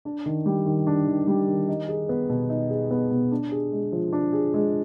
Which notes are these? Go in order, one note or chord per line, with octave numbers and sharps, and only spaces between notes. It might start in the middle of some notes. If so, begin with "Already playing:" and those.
D4
D#3
G3
D#3
D4
D#3
G3
D#3
D#4
G#4
B3
B2
D#4
G#4
B3
B2
D4
G#4
G#3
F3
D4
G#4
G#3